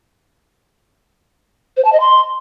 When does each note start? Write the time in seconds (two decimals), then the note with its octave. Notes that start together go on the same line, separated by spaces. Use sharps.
1.77 C5
1.85 A5
1.92 D#5
2.00 C6